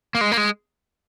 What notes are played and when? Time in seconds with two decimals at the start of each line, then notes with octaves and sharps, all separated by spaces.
0.15 A#3
0.21 G#3
0.32 A#3
0.37 G#3